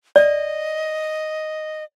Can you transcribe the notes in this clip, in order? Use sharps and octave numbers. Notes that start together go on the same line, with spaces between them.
D5 D#5